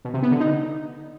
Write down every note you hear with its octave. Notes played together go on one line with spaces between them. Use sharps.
B2
C3
B3
D3
D#4